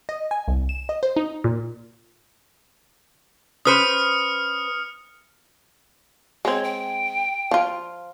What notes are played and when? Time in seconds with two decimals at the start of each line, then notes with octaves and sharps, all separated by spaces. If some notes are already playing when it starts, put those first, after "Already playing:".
0.09 D#5
0.31 G#5
0.48 C2
0.69 E7
0.89 D#5
1.03 C5
1.16 D#4
1.44 A#2
3.65 C#4 B4 C5 D#6 F6 C#7
6.45 G#3 C4 C#5
6.63 G5
7.51 F3 F4